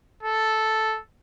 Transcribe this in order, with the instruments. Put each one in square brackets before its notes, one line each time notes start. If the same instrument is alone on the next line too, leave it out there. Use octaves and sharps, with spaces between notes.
[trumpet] A4